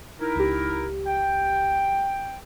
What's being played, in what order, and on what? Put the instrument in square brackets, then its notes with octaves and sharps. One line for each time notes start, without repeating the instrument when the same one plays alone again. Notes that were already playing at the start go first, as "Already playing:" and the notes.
[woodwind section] D#4 E4 A#4
[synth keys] C#2 G4
[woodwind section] G5